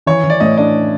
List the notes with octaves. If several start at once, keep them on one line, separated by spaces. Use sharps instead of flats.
E3 C#5
E3
D5
A2 D#5
D4 D#5